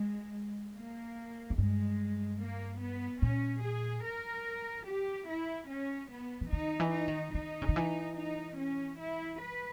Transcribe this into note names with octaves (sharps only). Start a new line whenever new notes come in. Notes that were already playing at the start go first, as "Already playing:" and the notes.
Already playing: G#3
A#3
E2
G2 G#3
A#3
B3
A#2 C#4
G#4
A#4
G4
E4
C#4
B3
E3
D#3 D#4
E3
D#4
D#3
D#3 D#4
C#3
D#3
E3
D#4
C#4
E4
B4